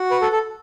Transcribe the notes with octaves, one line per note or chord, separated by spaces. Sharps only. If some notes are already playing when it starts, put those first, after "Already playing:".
Already playing: F#4
B4
A4
A4